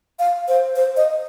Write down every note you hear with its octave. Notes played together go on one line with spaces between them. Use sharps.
F5
C5
C5
D#5